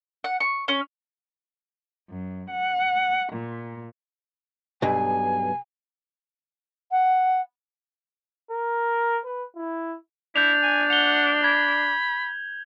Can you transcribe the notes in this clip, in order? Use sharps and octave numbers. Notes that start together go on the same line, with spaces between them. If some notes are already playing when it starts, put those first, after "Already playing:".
F#5
C#6
C#4
F#2
F#5
A#2
B1 G2 G#5
F#5
A#4
B4
E4
D4 E4 G6 F7
G#5
F#5 F7 G7
B5 G#6